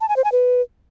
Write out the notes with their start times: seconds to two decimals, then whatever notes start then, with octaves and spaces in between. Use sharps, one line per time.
0.01 A5
0.09 G#5
0.16 C5
0.24 G#5
0.32 B4